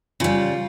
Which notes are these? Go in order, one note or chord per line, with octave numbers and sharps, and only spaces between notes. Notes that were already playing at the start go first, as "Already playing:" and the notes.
C#3 G3 F4